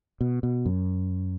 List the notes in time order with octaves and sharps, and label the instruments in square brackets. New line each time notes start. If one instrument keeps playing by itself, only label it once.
[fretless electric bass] B2
B2
F#2